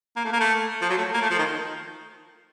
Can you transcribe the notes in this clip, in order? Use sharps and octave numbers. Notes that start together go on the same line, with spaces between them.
A#3
A3
A#3
A3
F3
F#3
A3
A#3
A3
F3
D#3